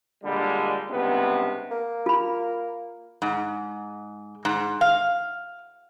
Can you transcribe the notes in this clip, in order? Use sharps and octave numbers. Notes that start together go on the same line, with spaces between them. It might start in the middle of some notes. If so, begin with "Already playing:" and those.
A#2 D3 G3 G#3
C#2 G2 C3 B3
A#3
F4 B5
G#2
G#2
F5